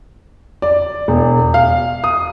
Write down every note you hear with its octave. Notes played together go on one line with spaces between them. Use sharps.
D5
E1
F5
D#6